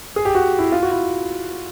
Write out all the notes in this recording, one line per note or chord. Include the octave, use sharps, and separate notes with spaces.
G#4
G4
F#4
E4
F4
F#4
E4